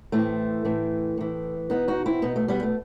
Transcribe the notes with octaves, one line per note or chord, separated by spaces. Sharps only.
A2 E3 A3 C4
A2 E3
A2 E3
B2 B3 D#4
D#4 F#4
C4 E4
B2 B3 D#4
A3
G3 B3
A3